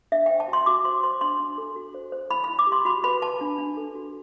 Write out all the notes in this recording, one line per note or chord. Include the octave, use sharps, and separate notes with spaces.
D4 E5
C5 G5
A5
F#4
C6
F#4 D6
C5 C6
C5 C6
D4 C6
D4
A4
F#4
C5
C5
E4 B5
B5
E4
D6
G4
C6
F#4 B5
B4 B5
B4 A5
D4
D4
A4
F#4